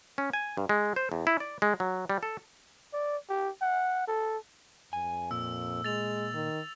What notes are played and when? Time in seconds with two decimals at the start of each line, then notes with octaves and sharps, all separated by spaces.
0.18 C#4
0.33 G#5
0.57 G2
0.69 G#3
0.96 C5
1.12 E2
1.27 E4
1.40 D5
1.62 G#3
1.80 F#3
2.10 G3
2.23 A4
2.93 D5
3.29 G4
3.61 F#5
4.07 A4
4.93 F2 G#5
5.31 A#2 E6
5.84 G#3 A6 F7
6.34 D#3